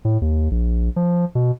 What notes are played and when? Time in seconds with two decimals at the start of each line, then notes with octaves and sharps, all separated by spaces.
0.05 A2
0.21 D#2
0.51 A#1
0.96 F3
1.35 B2